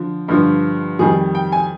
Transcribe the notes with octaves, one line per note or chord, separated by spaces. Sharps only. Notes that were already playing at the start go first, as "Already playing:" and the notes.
Already playing: D3 F3
G2 D3 F3
F2 D#3 G3 G#4
G5
G#5